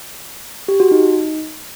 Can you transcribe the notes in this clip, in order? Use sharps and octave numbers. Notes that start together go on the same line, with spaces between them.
G4
F#4
D#4